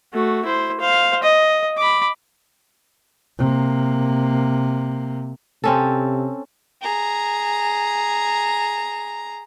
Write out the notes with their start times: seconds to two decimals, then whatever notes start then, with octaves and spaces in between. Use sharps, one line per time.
0.13 A3 F#4
0.45 E4 C5
0.80 C5 F5
1.23 D#5
1.77 B5 D6
3.38 C3 A#3
5.64 C3 C4 C#4 A4
6.82 G#4 A#5